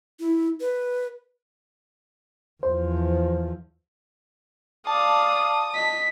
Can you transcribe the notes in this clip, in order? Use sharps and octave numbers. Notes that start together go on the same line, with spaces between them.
E4
B4
E2 F3 C5
D5 F5 A5 D#6
D#5 B6